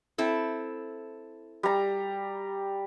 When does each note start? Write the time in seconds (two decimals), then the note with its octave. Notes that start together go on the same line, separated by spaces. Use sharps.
0.18 C4 E4 A4
1.63 G3 A#5